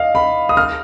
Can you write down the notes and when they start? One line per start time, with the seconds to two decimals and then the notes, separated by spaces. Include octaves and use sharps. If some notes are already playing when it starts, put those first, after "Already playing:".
Already playing: D#5 F5
0.15 B5
0.49 D#6
0.57 F6